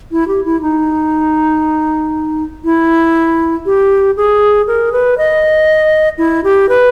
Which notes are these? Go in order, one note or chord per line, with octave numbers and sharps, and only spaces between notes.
E4
G4
E4
D#4
E4
G4
G#4
A#4
B4
D#5
E4
G4
B4